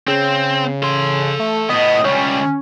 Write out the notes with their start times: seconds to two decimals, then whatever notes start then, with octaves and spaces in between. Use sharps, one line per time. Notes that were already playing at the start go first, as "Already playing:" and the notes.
0.08 C#3 C4
0.83 A4 C6
1.40 A3
1.69 A2 B3 D#5
2.05 C#2 G3 C#4